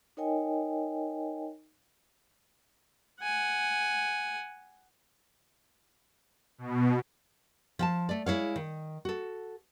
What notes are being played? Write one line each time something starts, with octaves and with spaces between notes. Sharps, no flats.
D#4 A#4 C#5 D#5 G5 G#5
F#5 G#5
B2
F3 G5 A5
A3 D5
G#3 E4 C#5 F5
D#3
F#4 A4